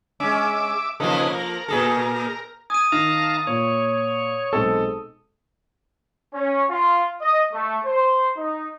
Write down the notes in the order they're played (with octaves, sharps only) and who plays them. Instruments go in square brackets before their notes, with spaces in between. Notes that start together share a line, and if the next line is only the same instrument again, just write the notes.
[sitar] G#3 C#4 [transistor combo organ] E5 D6
[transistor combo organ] C#3 D#4 B4 [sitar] F3 A#3 A4
[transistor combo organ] A#4
[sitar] A#2 G#4 A4
[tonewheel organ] G#5 [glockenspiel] D#6 D#7
[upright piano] D#3 [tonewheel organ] F5 A5 A#5
[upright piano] A#2 [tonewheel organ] C#5
[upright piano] B1 G#3 C4 [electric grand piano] A4
[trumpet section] C#4
F4
D#5
A3
C5
D#4